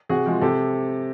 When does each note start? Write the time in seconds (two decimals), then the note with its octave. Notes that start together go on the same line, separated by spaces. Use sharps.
0.09 C3 F#4 G#4
0.26 F3 G#3
0.41 C3 G4 A4